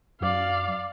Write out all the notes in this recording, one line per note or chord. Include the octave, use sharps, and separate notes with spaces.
F#2 D5 F5